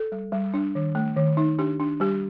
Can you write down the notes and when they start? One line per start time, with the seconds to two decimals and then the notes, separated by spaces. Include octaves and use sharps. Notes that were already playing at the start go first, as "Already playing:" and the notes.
Already playing: A4
0.12 G3
0.32 G3
0.54 D4
0.75 D#3
0.95 A3
1.16 D#3
1.37 D#4
1.59 D4 G4
1.80 D4
2.00 G3 G4